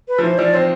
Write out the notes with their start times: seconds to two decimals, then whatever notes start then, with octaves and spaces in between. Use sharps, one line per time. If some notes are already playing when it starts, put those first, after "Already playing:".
0.08 B4
0.18 F3
0.23 E3 C5
0.38 F3 D5
0.54 C4 C5